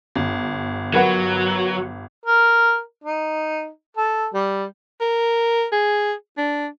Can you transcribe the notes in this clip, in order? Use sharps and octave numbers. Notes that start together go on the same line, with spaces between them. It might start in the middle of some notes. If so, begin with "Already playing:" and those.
G1
F#3 A#4 B4 F#5
A#4
D#4
A4
G3
A#4
G#4
D4